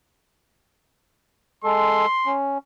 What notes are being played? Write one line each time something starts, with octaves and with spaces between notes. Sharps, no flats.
G#3 A4 C6
C#4